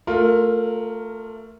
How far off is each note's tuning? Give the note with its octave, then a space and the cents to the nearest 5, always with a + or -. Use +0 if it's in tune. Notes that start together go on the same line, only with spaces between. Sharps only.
A3 +20 F4 +15 A#4 +0